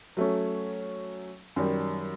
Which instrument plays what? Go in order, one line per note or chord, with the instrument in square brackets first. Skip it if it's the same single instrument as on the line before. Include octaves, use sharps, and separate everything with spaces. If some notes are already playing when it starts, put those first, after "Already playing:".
[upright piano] F#3 A3 C#4
F#2 D#3 G3